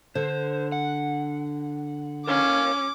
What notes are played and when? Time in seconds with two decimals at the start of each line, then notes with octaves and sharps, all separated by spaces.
0.15 D3 C5
0.72 F#5
2.27 C#4 A#4 C#5 F5 D6